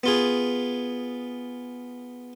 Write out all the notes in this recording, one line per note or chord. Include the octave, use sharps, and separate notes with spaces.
B3 F4 G#4